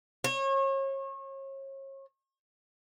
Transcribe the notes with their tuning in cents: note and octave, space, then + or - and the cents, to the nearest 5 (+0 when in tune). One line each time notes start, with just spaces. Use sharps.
C#5 -35